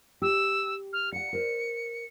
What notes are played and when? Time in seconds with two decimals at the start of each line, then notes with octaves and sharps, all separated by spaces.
0.22 G4 E6
0.92 F6
1.12 F5 F#5 C#7
1.33 A#4 C5